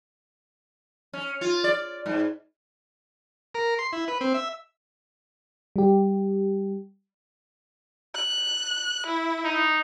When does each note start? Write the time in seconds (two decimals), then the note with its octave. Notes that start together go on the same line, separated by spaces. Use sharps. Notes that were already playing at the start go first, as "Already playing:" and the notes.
1.13 C#4
1.41 F4
1.64 D5
2.06 G#2
3.55 A#4
3.79 C6
3.93 E4
4.08 B4
4.21 C4
4.34 E5
5.76 G3 G4
8.15 F#6
9.06 E4
9.44 D#4